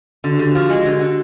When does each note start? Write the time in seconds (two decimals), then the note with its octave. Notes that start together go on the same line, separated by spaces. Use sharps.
0.24 D3 F#4
0.38 D3 G4
0.51 F3 F#4
0.70 G#3
0.85 D3
1.01 D3